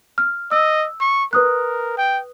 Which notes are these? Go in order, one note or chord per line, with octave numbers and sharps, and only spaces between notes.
F6
D#5 E6
C#6
A#4 B4 D#6 F#6
G5